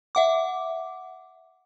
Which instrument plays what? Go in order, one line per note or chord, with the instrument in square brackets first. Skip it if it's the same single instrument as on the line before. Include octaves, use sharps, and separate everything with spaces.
[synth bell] E5 F#5 D6